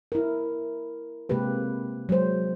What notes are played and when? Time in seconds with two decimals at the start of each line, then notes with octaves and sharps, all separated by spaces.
0.12 E4 A#4
1.29 C3 G#3 A#3 G4 B4
2.09 F#3 G#3 C5